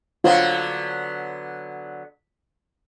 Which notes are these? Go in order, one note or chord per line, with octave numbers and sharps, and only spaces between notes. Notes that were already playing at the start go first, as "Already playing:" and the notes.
D3 F#3 B3 F4 C5